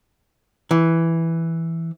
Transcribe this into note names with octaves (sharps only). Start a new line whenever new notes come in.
E3